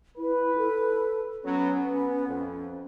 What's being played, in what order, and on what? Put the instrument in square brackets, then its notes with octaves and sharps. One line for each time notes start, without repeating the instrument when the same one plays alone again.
[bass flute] E4 [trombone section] B4
[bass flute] A4
[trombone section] F#3 B3 [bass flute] C#4
[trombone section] B3
F2